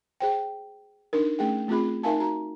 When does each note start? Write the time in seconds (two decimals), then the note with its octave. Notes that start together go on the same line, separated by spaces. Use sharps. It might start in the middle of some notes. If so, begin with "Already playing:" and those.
0.20 G#4 C5 G5
1.13 D4 D#4 A#4
1.39 A3 C#4 G#4 F#5 G5
1.68 A3 C4 F4 G#4 B5
2.03 D#4 A#4 E5 F5 G#5 A5
2.20 F#4 A#5